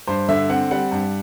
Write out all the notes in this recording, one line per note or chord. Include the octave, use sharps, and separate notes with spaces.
G2 C5
D3 E5
C4 F#5
G3 F#5
G2